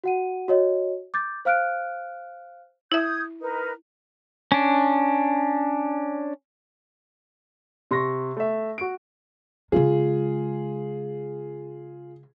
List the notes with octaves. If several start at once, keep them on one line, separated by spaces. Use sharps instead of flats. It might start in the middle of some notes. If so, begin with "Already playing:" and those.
F#4 F#5 D#7
F#4 C#5 D#5
D6 G6 A6
C5 F5 F6 F#6 D7
E4 E5 D#6 G6 G#6
D#4 A#4 B4
C#4 D4
C3 C6 C#6 A#6
A3 E5
F#4 D7
C#3 G#3 F4 G#4